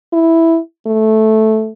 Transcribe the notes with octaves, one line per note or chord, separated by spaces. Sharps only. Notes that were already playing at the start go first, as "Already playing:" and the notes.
E4
A3